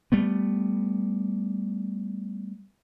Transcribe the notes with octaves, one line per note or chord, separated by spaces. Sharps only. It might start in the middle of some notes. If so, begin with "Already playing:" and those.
G3 A3 B3